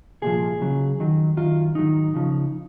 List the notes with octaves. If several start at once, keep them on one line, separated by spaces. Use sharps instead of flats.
C2 A#2 F3 G#4
C#2 C#3 F#3
F2 D#3 F#3
F#2 D#3 F#3 F4
G#2 D#3 F#3 D#4
C#2 C#3 F3